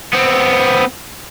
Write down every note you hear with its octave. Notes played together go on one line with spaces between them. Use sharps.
B3 C4